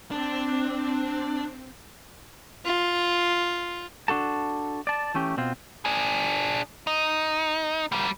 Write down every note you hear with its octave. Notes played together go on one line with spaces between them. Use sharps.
C4 D4
F4
D4 F#4 A4 A5
D5 A5
E3 A3 C#4 G4
B2 C4 F4
D4 G#4
D#4
G3 A#3